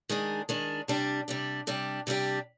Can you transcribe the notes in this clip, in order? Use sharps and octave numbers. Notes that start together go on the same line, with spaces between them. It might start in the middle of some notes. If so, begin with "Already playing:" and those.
D#3 G#3 D4 G#4
D#3 G#3 D4 G#4
C3 G3 D4 G4
C3 G3 D4 G4
C3 G3 D4 G4
C3 G3 D4 G4